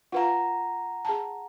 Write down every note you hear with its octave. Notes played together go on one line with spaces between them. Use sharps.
F4 B4 F5 F#5 A#5
G#4 A5